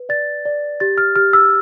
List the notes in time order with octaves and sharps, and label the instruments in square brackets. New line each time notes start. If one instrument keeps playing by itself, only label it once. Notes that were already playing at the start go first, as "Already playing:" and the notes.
Already playing: [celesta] B4
D5 A6
D5
G4 A6
F6
G4 F6
E6